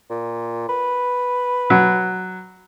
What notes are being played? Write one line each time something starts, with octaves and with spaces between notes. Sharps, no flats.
A#2
B4
F#3